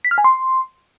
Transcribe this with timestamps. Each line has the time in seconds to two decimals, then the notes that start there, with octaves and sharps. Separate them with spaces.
0.05 B6
0.11 F6
0.18 G#5
0.24 C6